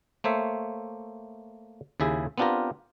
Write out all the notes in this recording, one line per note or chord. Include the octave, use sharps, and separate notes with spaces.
A3 A#3 C5 C#5 E5
D#2 C#3 E4 G#4 E5
B3 C4 D4 F4 G4 A#4